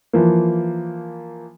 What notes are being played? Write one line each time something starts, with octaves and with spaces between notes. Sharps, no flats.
E3 F3 A#3